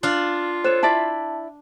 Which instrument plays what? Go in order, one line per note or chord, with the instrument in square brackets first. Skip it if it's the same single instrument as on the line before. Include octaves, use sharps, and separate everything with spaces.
[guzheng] D4 F5 [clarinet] F4
[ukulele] A4 C#5 [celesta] C5 F#6 E7
[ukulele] E4 D5 E5 [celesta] A5